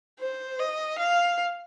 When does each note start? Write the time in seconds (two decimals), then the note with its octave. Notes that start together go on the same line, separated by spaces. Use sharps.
0.20 C5
0.60 D#5
0.99 F5